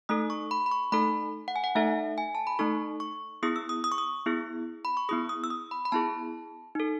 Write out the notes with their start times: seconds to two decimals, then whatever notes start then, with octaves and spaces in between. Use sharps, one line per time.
0.09 A3 D#4 A4 D#6
0.30 C#6
0.51 B5
0.66 B5
0.71 C#6
0.92 A3 D#4 A4 B5
1.48 F#5
1.56 G#5
1.64 F#5
1.75 A3 D#4 A4 E5
2.18 G#5
2.35 A5
2.47 B5
2.59 A3 D#4 A4 C#6
3.00 C#6
3.43 B3 E4 G#4 D#6
3.56 E6
3.69 D#6
3.84 D#6
3.92 C#6
3.98 D#6
4.26 B3 E4 G#4
4.85 B5
4.97 C#6
5.09 B3 E4 G#4 D#6
5.29 D#6
5.44 E6
5.50 D#6
5.71 B5
5.85 B5
5.92 B3 E4 G#4 A5
6.75 D#4 A4